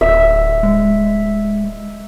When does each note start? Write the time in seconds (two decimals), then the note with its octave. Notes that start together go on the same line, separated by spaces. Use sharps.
0.01 D1 E5
0.63 G#3